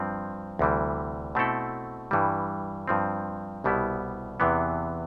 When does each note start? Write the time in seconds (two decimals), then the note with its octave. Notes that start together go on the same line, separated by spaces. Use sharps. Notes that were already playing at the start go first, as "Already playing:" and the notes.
Already playing: G2 F3 C4
0.59 D2 C3 E3 G3
1.35 B2 A3 C4 E4 A4
2.11 G2 E3 G3
2.88 G2 F3 C4
3.64 C2 B2 G3 B3 E4
4.40 E2 C3 E3 B3